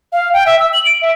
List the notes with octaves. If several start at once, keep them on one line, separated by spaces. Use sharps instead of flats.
F5
G5
E5
E6
F#7
D7
E5